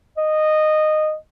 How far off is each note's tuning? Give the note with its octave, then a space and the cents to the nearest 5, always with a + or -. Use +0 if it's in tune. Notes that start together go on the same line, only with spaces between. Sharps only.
D#5 -15